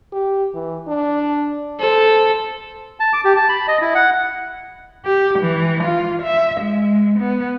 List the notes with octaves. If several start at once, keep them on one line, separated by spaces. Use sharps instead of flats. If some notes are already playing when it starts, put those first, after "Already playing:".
G4
E3
D4
A4 C5
A5
D6
G4
A5
B5
D#5
E4
F#5
G4
E3
F4
E5
G#3
B3